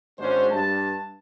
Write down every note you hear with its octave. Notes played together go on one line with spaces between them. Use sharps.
G#1 G#3 C#4 D4 F#4 C5
G2 A5